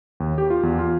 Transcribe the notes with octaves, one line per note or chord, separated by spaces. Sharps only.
D#2
G4
F4
E2
F4